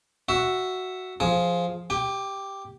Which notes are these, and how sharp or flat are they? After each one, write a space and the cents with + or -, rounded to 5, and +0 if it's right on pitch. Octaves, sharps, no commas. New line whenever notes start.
F#4 +0 E5 +0
F3 +0 G#4 +10
G4 +0 G5 +35